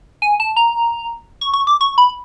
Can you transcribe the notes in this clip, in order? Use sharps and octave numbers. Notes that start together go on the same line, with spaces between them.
G#5
A5
A#5
C#6
C#6
D6
C#6
B5